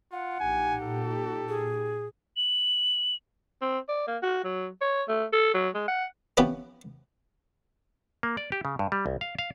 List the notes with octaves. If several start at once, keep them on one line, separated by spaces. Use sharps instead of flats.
F4 F#5
A#1 D#4 G4 G#5
A#2 A4
G#4
F#7
C4
D5
A#3
F#4
F#3
C#5
A3
A4
F#3
G#3
F#5
F3 B3 C#4 E4 G4 B4
A#3
D5
G4
C#3
G2
G3
C2
F5
F5